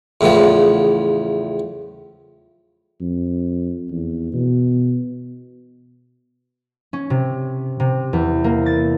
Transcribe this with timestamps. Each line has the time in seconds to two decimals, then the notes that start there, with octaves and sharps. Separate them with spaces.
0.21 E2 A2 C#3 F3 B3
3.00 F2
3.91 E2
4.34 B2
6.93 C#4
7.10 C3
7.80 C3
8.13 E2
8.44 A#3
8.66 A6